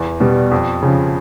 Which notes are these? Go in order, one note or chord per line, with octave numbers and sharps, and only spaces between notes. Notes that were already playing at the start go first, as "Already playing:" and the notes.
Already playing: E2
B2 G3
F2
C#3 F3